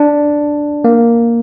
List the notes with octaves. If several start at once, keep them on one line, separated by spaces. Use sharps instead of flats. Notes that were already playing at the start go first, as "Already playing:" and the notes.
Already playing: D4
A#3